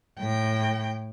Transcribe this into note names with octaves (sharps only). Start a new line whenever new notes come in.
A2 G5